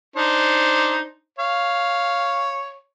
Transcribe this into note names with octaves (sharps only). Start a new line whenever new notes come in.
D4 D#4 C5
C#5 F5